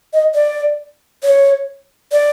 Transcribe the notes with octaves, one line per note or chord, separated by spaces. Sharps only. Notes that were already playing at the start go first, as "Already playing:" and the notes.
D#5
D5
C#5
D5